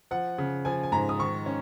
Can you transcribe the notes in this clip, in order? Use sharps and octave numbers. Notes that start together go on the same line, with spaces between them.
F3 F#5
C#3
F3 G#5
G#5
G#2 A#5
D#6
D#3 C#6
C#4